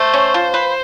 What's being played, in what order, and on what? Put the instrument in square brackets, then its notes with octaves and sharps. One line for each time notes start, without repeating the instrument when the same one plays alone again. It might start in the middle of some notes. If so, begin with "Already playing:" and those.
Already playing: [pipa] A3 [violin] C5
[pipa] C#4
F3
B4